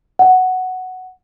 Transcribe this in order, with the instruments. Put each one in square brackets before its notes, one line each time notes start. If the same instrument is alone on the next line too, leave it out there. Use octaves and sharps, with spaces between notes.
[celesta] F#5